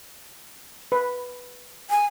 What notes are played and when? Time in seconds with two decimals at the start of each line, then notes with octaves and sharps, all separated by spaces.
0.92 B4
1.90 G#5